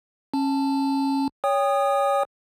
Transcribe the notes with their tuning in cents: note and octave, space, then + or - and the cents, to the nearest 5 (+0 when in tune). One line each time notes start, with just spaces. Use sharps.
C#4 -25 A5 +0
C#5 +20 G5 +30 D#6 -10